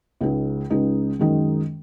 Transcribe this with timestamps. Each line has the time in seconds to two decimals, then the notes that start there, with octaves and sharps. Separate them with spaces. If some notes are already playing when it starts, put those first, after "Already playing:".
0.21 C#2 C#3 G#3 D#4 G#4
0.70 C#2 C#3 G#3 D#4 G#4
1.19 F#2 D#3 G#3 D#4